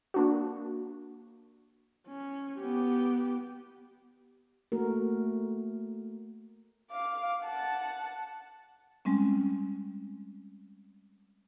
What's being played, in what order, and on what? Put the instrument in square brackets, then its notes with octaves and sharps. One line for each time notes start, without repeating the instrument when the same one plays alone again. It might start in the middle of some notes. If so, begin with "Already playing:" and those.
[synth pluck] A#3 D4 F#4
[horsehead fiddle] C#4
B3 G4
[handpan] A3 A#3 F#4 A#4
[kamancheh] F5 D6
F#5 A5
[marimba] G3 G#3 C4 C#4